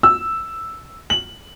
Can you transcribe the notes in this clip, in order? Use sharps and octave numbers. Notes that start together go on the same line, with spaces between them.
E6
F#7